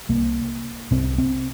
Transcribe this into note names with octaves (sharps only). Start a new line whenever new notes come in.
C2 C3 A#3
C2 C3 C4
C4